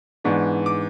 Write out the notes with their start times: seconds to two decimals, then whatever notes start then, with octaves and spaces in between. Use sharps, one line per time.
0.24 G#2 E3 B3 D4 C#6
0.66 D6